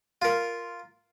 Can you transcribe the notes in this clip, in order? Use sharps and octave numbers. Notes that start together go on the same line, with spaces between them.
F4 A#4